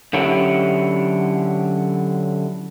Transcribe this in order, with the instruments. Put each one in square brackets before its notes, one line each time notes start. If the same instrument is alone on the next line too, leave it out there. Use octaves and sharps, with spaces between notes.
[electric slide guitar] D3 F#3 C#4 E4 G4